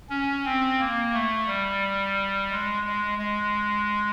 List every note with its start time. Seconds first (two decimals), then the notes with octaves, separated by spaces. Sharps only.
0.10 C#4
0.45 C4
0.79 A#3
1.13 A3
1.47 G3
2.51 G#3
2.84 G#3
3.18 G#3